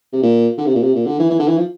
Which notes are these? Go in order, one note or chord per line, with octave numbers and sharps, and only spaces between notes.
C3
A#2
D3
C3
A#2
C3
A#2
D3
E3
E3
D3
E3
F3